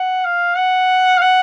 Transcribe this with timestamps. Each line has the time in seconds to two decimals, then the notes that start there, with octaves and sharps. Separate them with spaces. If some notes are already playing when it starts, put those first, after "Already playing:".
Already playing: F#5
0.25 F5
0.57 F#5
1.17 F5
1.22 F#5